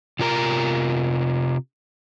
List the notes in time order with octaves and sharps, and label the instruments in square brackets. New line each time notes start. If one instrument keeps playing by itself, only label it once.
[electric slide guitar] C3 F4 A#4 A#5